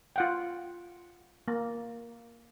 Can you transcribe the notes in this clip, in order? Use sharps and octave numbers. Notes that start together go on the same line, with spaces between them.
F4 F#5 G5
A#3